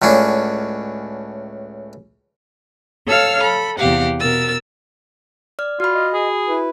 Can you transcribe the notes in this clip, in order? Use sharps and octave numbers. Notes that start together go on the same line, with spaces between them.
C#2 A2 C#4 D4
A4 C#5 F5 E6 F6
A4 B5
E2 C3 G4 F5 F#5
B2 A#4 E6 A6
D5 F6
F4 F#4 B5
D#5
G#4
E4 B4